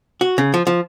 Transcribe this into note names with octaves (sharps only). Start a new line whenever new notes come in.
F#4
C#3
F3
F3